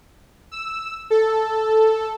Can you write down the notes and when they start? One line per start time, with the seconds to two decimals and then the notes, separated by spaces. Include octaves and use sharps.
0.52 E6
1.10 A4